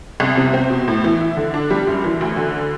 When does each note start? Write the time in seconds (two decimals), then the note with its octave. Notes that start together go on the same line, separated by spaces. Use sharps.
0.20 C2
0.37 C3
0.53 C4
0.70 B2
0.88 A2
1.04 E3
1.21 E4
1.37 D3
1.54 D4
1.70 G3
1.87 F#2
2.04 E3
2.21 D2
2.37 D3